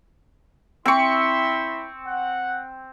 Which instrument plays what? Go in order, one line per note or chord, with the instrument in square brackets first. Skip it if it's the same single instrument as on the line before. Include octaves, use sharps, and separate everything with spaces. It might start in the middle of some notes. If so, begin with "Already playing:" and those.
[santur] C4 C#6 [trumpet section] E4 E5 C6
[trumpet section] F#5